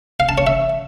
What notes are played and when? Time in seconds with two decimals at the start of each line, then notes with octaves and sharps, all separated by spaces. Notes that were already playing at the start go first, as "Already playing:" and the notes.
0.20 F5
0.29 A5
0.38 C#5
0.47 E5